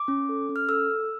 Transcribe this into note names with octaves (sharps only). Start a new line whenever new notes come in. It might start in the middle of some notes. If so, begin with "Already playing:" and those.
Already playing: D6
C#4
A4
C#4
F6
A4 E6